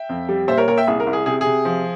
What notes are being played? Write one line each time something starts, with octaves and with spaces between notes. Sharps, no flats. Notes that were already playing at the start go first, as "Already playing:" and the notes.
Already playing: E5 G5
F2
G3
A#2 C5 E5
A#4 C#5
A#2 A#4 C#5
E5 G5
C2 G#4
A#4
C2
G#4
C3 G#4
C3 G#4
F3